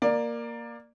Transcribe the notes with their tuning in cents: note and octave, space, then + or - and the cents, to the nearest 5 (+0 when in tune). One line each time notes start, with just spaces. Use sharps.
A#3 +0 D5 +15